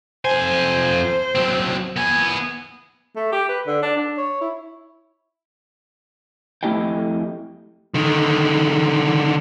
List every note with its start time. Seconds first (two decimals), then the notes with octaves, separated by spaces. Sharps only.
0.25 F2 C5 G#5
1.35 F#3 C4
1.96 B3 G#5
3.16 A3
3.32 G4
3.49 B4
3.67 D3
3.82 D4
3.97 D4
4.17 C#5
4.41 E4
6.63 F2 A3 E4 G4 D#5 G5
7.94 D3 D#3